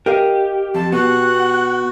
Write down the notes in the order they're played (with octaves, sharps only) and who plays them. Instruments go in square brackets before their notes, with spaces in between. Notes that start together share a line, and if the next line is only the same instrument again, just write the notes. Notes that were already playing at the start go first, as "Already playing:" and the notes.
[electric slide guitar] G4 [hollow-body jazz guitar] A#4 D#5 F5
[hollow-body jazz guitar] F2 [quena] A5
[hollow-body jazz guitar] B2 B3 [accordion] F#4 [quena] F#5